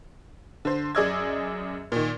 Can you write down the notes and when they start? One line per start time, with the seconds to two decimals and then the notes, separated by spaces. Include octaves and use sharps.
0.65 D3 C5
0.95 F#2 G#4 D5 D#5 E6 G#6
1.92 A#2 D#3